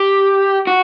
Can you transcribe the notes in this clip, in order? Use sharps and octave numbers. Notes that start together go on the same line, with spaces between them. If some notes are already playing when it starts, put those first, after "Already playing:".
Already playing: G4
F#4